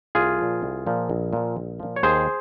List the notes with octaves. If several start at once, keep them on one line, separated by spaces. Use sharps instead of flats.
C2 F4 G#4
A#2 F3
C2
A#2 F3
A#1
A#2 F3
A#1
A#2 F3
C#5
D#2 G#4 C5